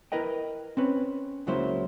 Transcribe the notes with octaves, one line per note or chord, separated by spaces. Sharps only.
E4 A#4 B4 D#5 G5
C4 C#4 B4
C#2 C#3 F#3 A#3 E4 C5